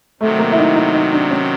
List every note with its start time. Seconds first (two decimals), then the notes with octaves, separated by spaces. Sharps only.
0.21 C3 D#3 F#3 A3
0.39 A#3
0.52 E4
0.58 D#4
0.76 D#4
0.94 D#4
1.13 D4
1.31 C#4